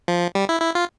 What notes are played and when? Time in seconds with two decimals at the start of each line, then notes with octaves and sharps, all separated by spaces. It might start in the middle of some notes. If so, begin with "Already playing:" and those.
0.08 F3
0.35 G3
0.49 E4
0.61 E4
0.75 F4